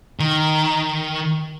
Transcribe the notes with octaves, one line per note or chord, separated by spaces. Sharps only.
D#3